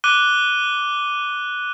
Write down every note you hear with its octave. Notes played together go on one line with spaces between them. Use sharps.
D6 F#6 D#7 G7